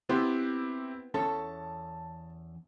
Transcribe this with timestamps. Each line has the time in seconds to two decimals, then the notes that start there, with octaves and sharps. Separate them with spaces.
0.09 B3 C4 E4 G4 B4 C5
1.14 E2 C#4 A4 A5